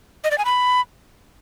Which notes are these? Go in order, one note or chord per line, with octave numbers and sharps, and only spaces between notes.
D#5
D5
G#5
B5